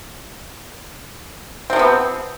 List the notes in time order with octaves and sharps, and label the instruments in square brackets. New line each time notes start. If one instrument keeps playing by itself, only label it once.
[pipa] C4
C3
F3
B3